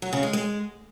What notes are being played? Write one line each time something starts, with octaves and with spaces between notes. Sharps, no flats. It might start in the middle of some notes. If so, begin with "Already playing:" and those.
F#3
C#3
G#3
G#3